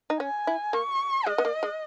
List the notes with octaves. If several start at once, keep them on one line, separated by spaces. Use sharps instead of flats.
D#4
C#4 G#5
E4
A#3 C#6
G#3 D#5
B3
A#3
G#3